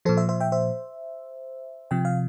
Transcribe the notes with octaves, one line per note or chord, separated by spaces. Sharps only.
A#2 F3 A4 C5
C5 E5
C5 E5
E5 G5
C5 E5
C3 F3 G5
F5